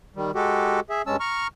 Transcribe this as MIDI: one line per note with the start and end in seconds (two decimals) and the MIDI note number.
0.16 0.31 51
0.16 0.31 55
0.35 0.80 56
0.35 0.80 66
0.35 0.80 67
0.35 0.80 69
0.90 1.02 68
0.90 1.02 76
1.07 1.16 43
1.07 1.16 56
1.07 1.16 61
1.07 1.16 81
1.07 1.16 88
1.20 1.47 82
1.20 1.47 85
1.20 1.47 89